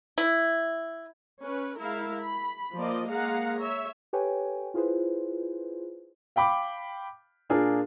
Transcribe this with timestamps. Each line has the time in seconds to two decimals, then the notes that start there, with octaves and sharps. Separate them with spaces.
0.18 E4
1.42 C#4 B4
1.79 G#3 E4 A#4 F5
2.22 B5
2.77 F3 A#3 D5 D#5
3.10 G#3 A#3 G#4 F5 F#5 A#5
3.59 C#5 E5
4.13 G4 A4 B4 C#5 G5 G#5
4.74 E4 F4 G#4 B4 C5
6.36 F5 G5 B5 D6
7.50 A#2 D4 F4 G#4 A#4